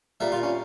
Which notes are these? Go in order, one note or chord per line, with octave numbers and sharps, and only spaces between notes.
A#2 G3 A#3 E5
F4
C#4